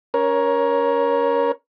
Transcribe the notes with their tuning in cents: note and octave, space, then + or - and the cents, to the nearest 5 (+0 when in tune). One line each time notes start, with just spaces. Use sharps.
C#4 +25 A#4 +20 C#5 +0